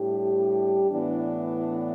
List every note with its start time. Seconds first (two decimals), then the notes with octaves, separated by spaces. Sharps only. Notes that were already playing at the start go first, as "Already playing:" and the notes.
Already playing: A2 G3 D4 G4
0.90 A2 E3 B3 D4